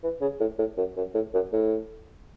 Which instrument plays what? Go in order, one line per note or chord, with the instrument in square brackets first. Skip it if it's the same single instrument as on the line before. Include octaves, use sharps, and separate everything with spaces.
[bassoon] E3
C#3
A2
A2
F#2
F#2
A2
F#2
A2